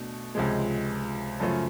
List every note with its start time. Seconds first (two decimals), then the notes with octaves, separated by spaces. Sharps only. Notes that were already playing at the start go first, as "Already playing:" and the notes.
Already playing: B2 A3 D4
0.35 C#2 C3 F3 G#3
1.40 F#2 C#3 F3 A3